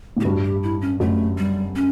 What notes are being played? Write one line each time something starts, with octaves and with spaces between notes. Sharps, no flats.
A2
G4
G2 F#4
G4
E4
C#4
F#2 A3
G3
C#4